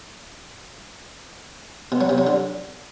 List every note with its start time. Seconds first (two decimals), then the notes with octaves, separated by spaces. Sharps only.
1.92 B2
2.01 F#3
2.09 C3
2.18 F#3
2.27 D3